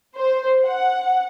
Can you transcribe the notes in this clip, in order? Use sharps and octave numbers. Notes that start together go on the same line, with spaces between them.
C5
F#5